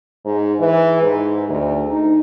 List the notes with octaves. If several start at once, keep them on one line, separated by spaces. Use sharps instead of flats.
G#2
E3
G#2
D2
D#4